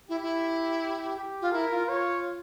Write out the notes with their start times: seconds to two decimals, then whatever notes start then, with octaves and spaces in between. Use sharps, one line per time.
0.08 E4 G4
0.23 E4
1.17 G4
1.41 F4
1.52 E4 A#4
1.71 F4
1.88 F4 C#5